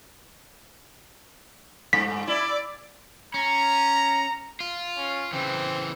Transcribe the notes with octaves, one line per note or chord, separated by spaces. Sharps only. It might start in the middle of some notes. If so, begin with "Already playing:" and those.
G2 B6
E4 D5
C#4 A#5
F4
C#4
C#3 E3 C4